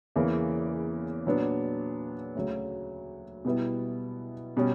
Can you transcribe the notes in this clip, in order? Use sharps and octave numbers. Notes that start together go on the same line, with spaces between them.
E2 C#3 E3 A#3 C#4
A#2 F#3 B3 D4
D2 C#3 F#3
B2 G3 B3 E4
B2 G3 C#4